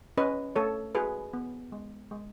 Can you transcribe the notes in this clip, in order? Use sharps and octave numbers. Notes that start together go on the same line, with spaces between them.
C#4 B4 D#5
A3 A4 C#5
F#4 G#4 B4
B3
G#3
G#3